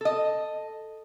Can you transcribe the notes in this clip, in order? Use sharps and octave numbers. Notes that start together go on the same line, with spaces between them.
A4 D#5